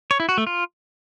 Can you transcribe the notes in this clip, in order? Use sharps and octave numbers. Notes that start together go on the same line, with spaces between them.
C#5
E4
F#4
A3
F4